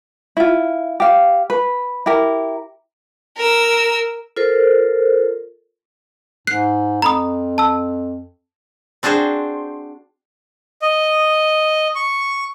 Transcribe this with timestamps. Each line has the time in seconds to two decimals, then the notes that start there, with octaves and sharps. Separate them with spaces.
0.37 E4 F4
1.00 G4 F5
1.50 B4
2.06 E4 G4 A#4
3.37 A#4 E6
4.36 F4 A4 A#4 C5
6.47 G#2 F#6 C7
7.02 F2 A#5 B5 D#6
7.58 A5 E6
9.03 C4 D4 F#4 G#4 C5
10.82 D#5
11.95 C#6